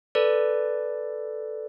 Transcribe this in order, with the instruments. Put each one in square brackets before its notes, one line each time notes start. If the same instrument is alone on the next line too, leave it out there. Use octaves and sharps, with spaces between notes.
[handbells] A4 B4 D5